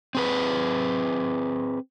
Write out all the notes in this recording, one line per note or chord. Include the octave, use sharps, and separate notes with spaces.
C4 G#4 B4